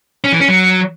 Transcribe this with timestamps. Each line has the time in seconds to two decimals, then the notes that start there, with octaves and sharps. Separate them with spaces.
0.24 C#4
0.32 E3
0.40 C#4
0.48 F#3